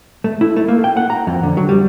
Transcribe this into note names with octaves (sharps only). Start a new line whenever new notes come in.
A3
E4
A3
A#3
G5
F#5
A#5
F2
D3
F#3
G3